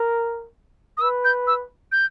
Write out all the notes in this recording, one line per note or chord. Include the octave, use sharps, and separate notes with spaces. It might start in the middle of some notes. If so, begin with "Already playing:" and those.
Already playing: A#4
D#6
B4 E6
G6
E6
G6